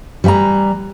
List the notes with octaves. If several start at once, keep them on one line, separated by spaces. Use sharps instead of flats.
G3 B4 G5 G#5 A#5